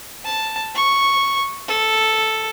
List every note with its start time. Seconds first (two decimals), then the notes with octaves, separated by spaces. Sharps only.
0.25 A5
0.75 C#6
1.68 A4